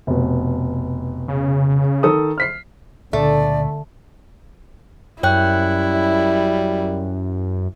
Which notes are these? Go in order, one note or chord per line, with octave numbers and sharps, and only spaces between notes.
F1 B2
C#3
D#3 A4 D#6
F6 B6 C7
C#2 A#2 D3 A3 B3 D5
F#2 G3 E4 C#5 G5 F#6